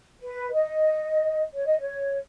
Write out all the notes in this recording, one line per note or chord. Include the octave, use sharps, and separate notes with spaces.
B4
D#5
C#5
D#5
C#5